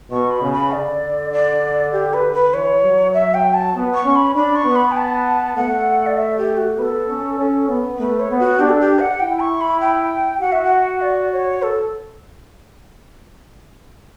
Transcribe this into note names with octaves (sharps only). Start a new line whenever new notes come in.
B2 C#6
B5
C#3
B5
D3 D5
D5
G4
B4
B4
E3 C#5
F#3
E5
G5
A5
B3
C#6
C#4
B5
D4 B5
C#6
B3
B5
G5
A5
A3 F#5
D5
E5
G4
F#4
B3 A4 B4
C#4
C#4
B3
A3 B4
C#5
B3
F#4
D4 G4
A4
G4
F#5
E4 G5
C#6
B5
G5
F#4 F#5
E5
F#5
D5
C#5
A4